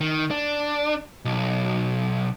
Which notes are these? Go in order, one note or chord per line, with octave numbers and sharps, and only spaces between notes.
D#3
D4
B1